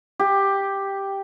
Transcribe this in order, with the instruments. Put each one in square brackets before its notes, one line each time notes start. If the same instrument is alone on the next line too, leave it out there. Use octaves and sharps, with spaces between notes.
[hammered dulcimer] G4